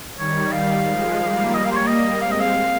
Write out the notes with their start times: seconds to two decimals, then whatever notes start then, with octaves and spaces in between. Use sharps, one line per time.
0.18 D#3 G3 C#5
0.52 F5
0.86 F3 G#3
1.20 G3 A#3
1.54 G3 A#3 D#5
1.65 F5
1.72 C5
1.76 C#5
1.87 D#5
2.22 G#3 C4 F5
2.32 D#5
2.40 F5